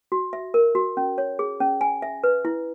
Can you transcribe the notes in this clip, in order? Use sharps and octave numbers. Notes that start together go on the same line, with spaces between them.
F#4
E5
A#4
F#4
C#4
C#5
G#4
C#4
G#5
E5
B4
E4